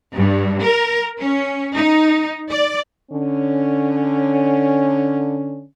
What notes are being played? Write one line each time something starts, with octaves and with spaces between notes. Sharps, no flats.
G2
A#4
C#4
D#4
D5
D3 C#4